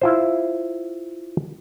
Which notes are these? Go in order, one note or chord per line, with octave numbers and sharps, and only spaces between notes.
E4 F4 C5